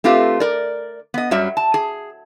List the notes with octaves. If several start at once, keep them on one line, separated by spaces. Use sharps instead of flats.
A3 C4 F4 G4 B4
A#4 D5
B3 D#5
F#2 F#3 G3 E5
A5
G#4